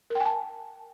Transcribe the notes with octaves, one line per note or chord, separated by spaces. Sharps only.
A#4
G5
G#5
A5